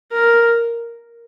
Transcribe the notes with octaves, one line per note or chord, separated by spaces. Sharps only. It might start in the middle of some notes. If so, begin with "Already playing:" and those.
A#4